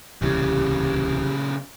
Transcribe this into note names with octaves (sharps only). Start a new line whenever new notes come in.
D1 C2 A#2 C#3 E3 G4